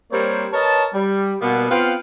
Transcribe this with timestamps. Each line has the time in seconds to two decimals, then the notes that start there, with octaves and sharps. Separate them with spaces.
0.12 G3 A#3 C4 A#4 C5 C#5
0.52 A#4 B4 C#5 D#5 A5
0.93 G3
1.41 B2 G3 A#3 B3
1.70 B3 C4 F4 B4 F5 G5